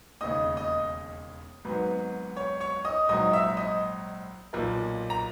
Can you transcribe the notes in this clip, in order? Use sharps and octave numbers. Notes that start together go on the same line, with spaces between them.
E1 D#2 C#3 D#5 D#6
D#5 D#6
G#1 G#2 F#3 B3
C#5 C#6
C#5 C#6
D#5 D#6
A#1 G#2 F#3 D#5 D#6
E5 E6
D#5 D#6
B1 A#2 A#3
A#5